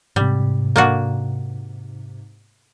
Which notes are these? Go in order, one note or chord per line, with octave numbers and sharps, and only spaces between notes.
G#2 C3 G3
A#3 D4 F#4